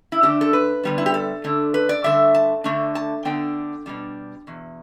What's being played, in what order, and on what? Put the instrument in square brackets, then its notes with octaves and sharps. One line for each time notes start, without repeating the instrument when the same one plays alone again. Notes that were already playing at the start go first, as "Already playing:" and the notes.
[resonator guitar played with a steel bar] E4
D3 A3 D4 G4
A4
B4
D3 G3 B3 D4
E4
G4
A4
D3 A3 D4
B4
D5
G2 D3 A3 D4 E5
A5
D3 A3 D4
A5
D3 B3 D4 G5
B2 G3 D4
E2 B2